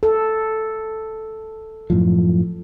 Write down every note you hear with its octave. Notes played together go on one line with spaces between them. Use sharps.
A4
F#2 A2 F3